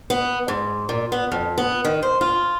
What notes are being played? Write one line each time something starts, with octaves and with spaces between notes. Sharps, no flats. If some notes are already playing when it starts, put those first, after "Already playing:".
B3
G#2
A#2
B3
F2
B3
D#3
C5
F4